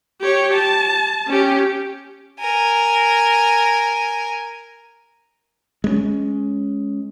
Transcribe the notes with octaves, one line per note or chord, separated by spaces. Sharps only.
G4 C#5
A5
C#4 G4
A#4 G#5
G#3 B3 C#4